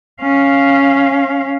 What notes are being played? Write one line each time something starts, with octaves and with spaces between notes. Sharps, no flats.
C#4 F5